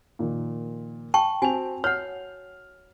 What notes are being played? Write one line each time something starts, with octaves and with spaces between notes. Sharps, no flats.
A#2 D#3 F3
G5 A5 C#6
C4 F#4 G#5 F7
C#5 F#5 F6